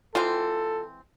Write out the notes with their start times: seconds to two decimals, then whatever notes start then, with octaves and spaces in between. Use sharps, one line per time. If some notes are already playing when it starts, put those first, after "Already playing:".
0.15 E3 G#3 C4 F4 A4 G5